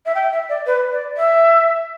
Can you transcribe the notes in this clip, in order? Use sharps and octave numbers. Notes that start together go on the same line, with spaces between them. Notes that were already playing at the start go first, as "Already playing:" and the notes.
E5
G5
E5
D5
B4
D5
E5